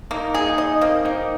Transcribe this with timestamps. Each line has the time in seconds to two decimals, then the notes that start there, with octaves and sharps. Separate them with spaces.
0.11 A#3 D#4
0.34 G#4
0.46 D#4
0.58 D#5
0.81 A#3 C4
1.05 A#3 D#4